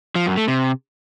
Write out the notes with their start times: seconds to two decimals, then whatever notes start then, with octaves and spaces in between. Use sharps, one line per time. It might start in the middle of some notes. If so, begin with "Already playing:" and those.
0.15 F3
0.26 F#2
0.37 A3
0.48 C3